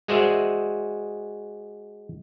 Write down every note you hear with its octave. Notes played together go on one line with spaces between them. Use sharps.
G#3 F#4 G#4 C5 D5 E5